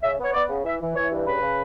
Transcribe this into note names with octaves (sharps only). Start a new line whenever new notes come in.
C#3 E5
B3 C#5
B3 D5
C#3
E3 E5
E3
E3 C#5
G2
C#3 B4
C#3